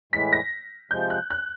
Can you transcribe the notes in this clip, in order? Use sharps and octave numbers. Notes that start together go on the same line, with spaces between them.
A2 E3 G#3 B6
A#6
C3 F3 G#3 G6
F#6
F#6